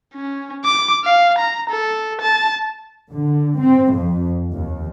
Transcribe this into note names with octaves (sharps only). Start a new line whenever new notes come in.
C#4
D6
F5
A#5
A4
A5
D3
C4
F2
D#2